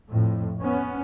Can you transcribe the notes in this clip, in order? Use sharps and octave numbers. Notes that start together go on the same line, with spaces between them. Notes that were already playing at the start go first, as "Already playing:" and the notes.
F2 A2
B3 C#4